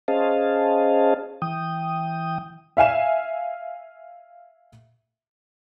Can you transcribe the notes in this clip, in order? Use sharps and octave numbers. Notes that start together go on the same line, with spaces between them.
C#4 G#4 C5 D#5 F5 A5
E3 G5 D#6
E5 F5 G#5 E7